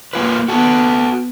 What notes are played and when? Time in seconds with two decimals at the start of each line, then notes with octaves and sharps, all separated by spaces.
0.13 A#3 F4 B4
0.48 B3 F#4 A4